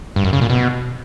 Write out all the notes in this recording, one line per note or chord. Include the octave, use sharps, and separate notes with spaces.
G2
F#2
C#3
A#2
B2